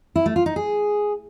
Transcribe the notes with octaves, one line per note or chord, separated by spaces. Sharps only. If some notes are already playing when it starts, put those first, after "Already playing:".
E4
A3
F4
D#4
G#4